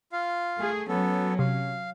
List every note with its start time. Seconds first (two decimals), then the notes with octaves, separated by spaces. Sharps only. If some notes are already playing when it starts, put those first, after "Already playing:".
0.13 F4 F5
0.58 A3 G#4
0.88 F#3 B3 C#4 A4
1.39 C3 F5